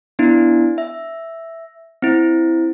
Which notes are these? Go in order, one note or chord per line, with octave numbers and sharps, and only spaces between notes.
B3 D4 E4
E5
C4 E4